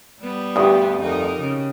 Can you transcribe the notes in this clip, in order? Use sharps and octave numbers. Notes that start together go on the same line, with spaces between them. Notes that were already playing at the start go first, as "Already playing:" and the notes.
G3 B3
D2 G2 G4 D#6
F2 D#4 A#4
C#3